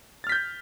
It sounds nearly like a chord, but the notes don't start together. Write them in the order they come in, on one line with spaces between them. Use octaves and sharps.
A6 F6 B6 G6